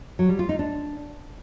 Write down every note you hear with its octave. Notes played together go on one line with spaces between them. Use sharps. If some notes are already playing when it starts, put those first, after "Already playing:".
F#3
G3
F4
D#4
D4